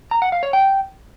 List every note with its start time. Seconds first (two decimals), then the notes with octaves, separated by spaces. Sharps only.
0.11 A#5
0.22 F#5
0.32 F5
0.43 C#5
0.53 G5